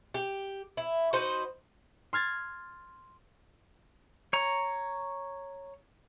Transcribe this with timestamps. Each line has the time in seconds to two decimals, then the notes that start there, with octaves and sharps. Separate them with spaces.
0.14 G4
0.77 E4
1.13 D#4 F#4 B4 C5
2.13 C6 F6 G#6 A6
4.33 C#5 A#5